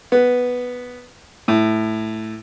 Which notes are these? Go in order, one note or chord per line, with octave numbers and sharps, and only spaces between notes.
B3
A2